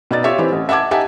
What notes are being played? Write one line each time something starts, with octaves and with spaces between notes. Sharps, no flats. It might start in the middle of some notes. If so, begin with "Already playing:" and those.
B2 D#4 D5 A6
F4 G4 C#5 E5
E3 C4 G4
A1
E5 F#5 A5 D6 G#6
D#4 G4 E5 F#5 G#5 A5